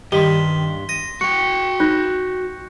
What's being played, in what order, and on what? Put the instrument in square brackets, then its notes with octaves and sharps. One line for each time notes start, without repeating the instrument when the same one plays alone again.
[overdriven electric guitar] G2 [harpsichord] D#3 [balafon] G4 [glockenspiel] C6 B6 G7
[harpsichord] D#6 [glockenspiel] A#6
[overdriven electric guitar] F#4 G5 [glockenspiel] C#6 F#6 C#7
[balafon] D#4 [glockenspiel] F#6 G6 A#6